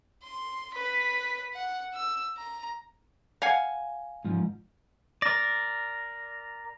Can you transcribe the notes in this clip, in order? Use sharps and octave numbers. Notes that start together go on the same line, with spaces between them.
C6
B4 B6
F#5
E6
A#5
F5 F#5 G#5
G#2 F3
A#4 D5 A#6